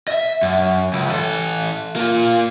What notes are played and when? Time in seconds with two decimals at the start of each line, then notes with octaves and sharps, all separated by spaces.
0.08 D#5 E5
0.42 F#2
0.93 C#2
1.09 E3 A4
1.96 A#3 F4